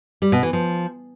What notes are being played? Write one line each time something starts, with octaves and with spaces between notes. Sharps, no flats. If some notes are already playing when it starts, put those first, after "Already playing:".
G3
B2
E3
F3